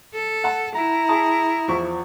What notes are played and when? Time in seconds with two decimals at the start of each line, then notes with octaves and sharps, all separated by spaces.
0.14 A4
0.44 F#5 A5
0.75 E4 A#5
1.09 G#4 A5 D#6
1.68 E2 F3 C#6